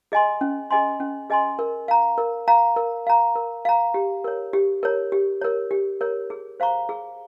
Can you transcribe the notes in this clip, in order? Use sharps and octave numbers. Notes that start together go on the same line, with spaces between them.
G#4 D#5 G#5 C6
C#4
G#4 D#5 G#5 C6
C#4
G#4 D#5 G#5 C6
A#4
F5 A#5
A#4
F5 A#5
A#4
F5 A#5
A#4
F5 A#5
G4
A#4 C#5
G4
A#4 C#5
G4
A#4 C#5
G4
A#4 C#5
G#4
C5 F5 A#5 C#6
G#4